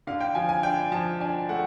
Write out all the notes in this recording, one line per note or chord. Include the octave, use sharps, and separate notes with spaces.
D3 F5
G5
F3 G#5
G#5
D4 G5
F3 A5
D4 G#5
A3 F#5